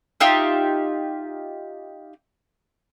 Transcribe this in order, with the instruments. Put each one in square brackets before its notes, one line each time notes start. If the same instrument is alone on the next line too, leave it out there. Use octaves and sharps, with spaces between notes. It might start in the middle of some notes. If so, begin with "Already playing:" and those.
[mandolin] D#4 F4 G4 E5